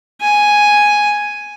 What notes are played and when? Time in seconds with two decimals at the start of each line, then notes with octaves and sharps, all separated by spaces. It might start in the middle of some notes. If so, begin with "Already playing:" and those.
0.21 G#5